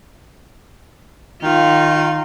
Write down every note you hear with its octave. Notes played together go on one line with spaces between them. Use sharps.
D#3 F4